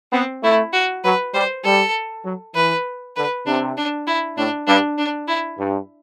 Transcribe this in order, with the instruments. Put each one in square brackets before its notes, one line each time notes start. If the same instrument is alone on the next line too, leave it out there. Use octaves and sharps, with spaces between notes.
[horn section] B3 [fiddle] C4
[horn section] A3 [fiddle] E4
[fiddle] F#4
[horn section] F#3 [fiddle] B4
[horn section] G3 [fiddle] C5
[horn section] G3 [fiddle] A4
[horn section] F#3
[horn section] E3 [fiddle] B4
[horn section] D3 [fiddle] B4
[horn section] C3 [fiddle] D4
[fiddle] D4
E4
[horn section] A2 [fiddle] D4
[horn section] G2 [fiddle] D4
[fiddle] D4
E4
[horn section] G2